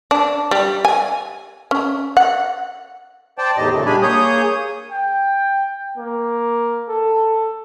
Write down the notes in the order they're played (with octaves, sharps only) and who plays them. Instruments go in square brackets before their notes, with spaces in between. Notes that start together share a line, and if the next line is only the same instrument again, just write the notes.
[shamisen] D4
G3
G#5
C#4
F#5
[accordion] C5 D5 G5 A5
E2 A2 D#3 G4 D#5
A#2 C#3 A3
G3 D4 G4 G#5 B5
A#3 G#4 C#5 D#6 G6
[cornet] G5
A#3
A4